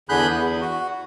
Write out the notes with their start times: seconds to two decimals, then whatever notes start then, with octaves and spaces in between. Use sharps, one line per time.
0.09 E2 D3 G#4 B5 F#6 G6
0.29 E2
0.61 F#4